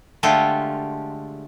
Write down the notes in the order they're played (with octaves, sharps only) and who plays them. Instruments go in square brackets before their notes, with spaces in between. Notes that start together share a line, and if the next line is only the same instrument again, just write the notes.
[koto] D3 G#3 A3 F4 G4 A4